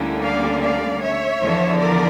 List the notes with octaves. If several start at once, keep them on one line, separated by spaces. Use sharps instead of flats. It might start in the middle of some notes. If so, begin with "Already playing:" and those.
Already playing: D2 D3 G3 A#3 C#4 E4
D5 F5
D5 F5
C#5 E5
E2 D3 F3
A#4 D5